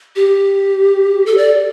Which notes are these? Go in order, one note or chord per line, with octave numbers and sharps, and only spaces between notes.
G4
A4
D5